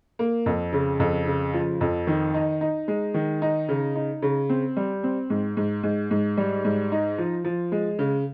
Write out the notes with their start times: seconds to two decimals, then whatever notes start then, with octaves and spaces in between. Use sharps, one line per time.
0.19 A#3
0.46 F2
0.73 C#3
1.00 F2
1.26 C#3
1.54 F3
1.81 F2
2.07 D#3
2.34 D#4
2.61 D#4
2.88 G#3
3.14 D#3
3.42 D#4
3.69 C#3
3.95 D#4
4.22 C#3
4.49 C4
4.77 G3
5.04 C4
5.30 G#2
5.57 G#2
5.83 G#2
6.11 G#2
6.37 G3
6.64 G#2
6.92 D#4
7.18 F3
7.45 F3
7.72 G#3
7.99 C#3